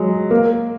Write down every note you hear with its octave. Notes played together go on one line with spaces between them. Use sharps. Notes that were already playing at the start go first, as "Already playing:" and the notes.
Already playing: F#3 G#3
A#3